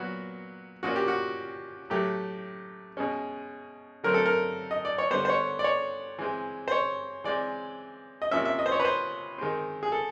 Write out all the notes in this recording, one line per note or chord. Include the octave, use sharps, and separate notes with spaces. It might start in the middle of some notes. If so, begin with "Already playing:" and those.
Already playing: A#2 F#3 B3 F#4
A#2 F3 A#3 C#4 F#4
G4
F#4
A2 F#3 A3 G4
B2 G#3 C#4
D3 F#3 A3 C4 A#4
A4
A#4
D#5
D5
C#5
D3 G3 B3 C5
C5
C#5
D5
C#5
E3 G#3 C4
C5
C#5
E3 G#3 C4 D5
D#5
C3 F3 A#3 C#4 E5
E5
D#5
C5
C#5
B4
C5
D#3 G#3 C4
G#4
A4